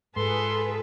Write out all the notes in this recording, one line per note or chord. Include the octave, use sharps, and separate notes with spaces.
G#2 F4 G#4 A4 B4 C6